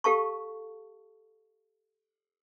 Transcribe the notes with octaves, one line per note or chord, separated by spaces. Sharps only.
G4 A4 F5 A5 C#6